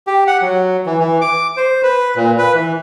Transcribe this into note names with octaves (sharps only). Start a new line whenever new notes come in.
G4
F#5
F#3
E3
E3
D6
C5
B4
A#2
B4
E3